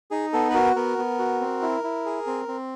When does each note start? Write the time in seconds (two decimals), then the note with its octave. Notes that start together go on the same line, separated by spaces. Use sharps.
0.11 D#4 G#4
0.33 B3 A4
0.50 B4
0.54 F#4 A#4
0.76 B3 A#4
0.98 B3
1.19 F#4
1.41 C4
1.62 E4
1.84 E4
2.05 G#4
2.27 C4
2.48 C4